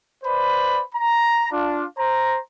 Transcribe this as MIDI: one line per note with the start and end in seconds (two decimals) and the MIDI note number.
0.24 0.82 71
0.24 0.82 72
0.24 0.82 74
0.24 0.82 83
0.94 1.50 82
1.51 1.85 62
1.51 1.85 65
1.98 2.40 72
1.98 2.40 82